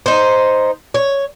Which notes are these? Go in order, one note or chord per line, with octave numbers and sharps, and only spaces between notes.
D#4 C5
C#5